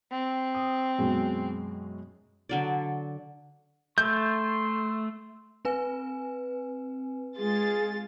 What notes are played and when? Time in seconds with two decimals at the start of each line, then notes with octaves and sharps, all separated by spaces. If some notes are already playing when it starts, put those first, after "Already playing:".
0.11 C4
0.55 D#6
0.98 F#2 B2 G#3
2.49 D3 F#3 D5
3.98 A3 C6 G6
5.65 C4 B4 G#5
7.37 G#3 F4 G#4 A6